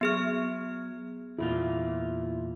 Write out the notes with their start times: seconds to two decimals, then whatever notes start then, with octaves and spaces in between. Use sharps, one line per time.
0.01 F#3 B3 G#4 F6
1.38 E2 A#2 E4 F4